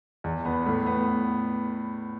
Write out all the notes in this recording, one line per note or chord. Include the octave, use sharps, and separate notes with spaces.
E2
B3
A2
B3